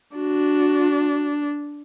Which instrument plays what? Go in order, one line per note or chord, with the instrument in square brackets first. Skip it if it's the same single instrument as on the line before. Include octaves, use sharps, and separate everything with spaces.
[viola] D4 [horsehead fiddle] F#4